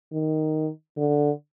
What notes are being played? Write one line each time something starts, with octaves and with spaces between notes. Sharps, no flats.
D#3
D3